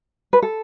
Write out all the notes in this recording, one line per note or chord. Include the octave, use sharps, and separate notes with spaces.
B4
A4